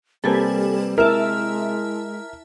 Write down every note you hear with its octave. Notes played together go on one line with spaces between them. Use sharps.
C3 G3 A#3 C4 A4 B4 G#5
G#3 E4 A#4 E5 A5